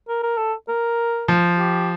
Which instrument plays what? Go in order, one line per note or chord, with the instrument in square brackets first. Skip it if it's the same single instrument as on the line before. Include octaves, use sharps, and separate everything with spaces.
[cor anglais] A#4
A#4
A4
A#4
[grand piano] F3
[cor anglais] G4